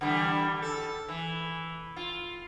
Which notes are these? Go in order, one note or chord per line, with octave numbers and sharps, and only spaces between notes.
D3 E3 G3
A4
E3
F4